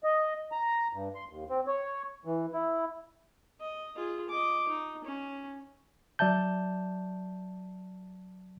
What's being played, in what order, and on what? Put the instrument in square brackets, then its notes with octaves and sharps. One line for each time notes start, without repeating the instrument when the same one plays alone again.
[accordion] D#5
A#5
G2
C6
D#2
C4
C#5
E3
E4
[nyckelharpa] D#5
F4 G#4
D#5 D6
D#4
C#4
[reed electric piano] F#3 D5 E5 A5 G6